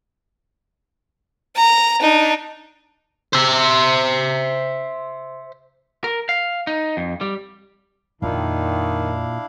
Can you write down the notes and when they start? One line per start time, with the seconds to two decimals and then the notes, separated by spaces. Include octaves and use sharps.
1.56 A#5
2.01 D4 D#4
3.33 C5 E5
6.04 A#4
6.29 F5
6.67 D#4
6.97 F2
7.21 G3
8.22 F2 A#2 D#3 D4 E4 F5